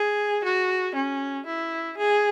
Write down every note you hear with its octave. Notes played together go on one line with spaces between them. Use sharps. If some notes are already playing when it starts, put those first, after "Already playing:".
Already playing: G#4
F#4
C#4
E4
G#4